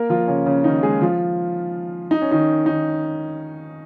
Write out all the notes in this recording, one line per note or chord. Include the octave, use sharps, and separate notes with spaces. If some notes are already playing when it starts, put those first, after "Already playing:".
Already playing: A#3 A#4
F3 F4
C#3 C#4
C#3 C#4
D#3 D#4
G#3 G#4
F3 F4
D#4
C#4
D#3 D#4
D#3 D#4